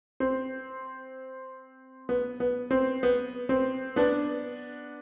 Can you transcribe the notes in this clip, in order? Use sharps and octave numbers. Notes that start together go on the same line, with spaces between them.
C4
B3
B3
C4
B3
C4
B3 D4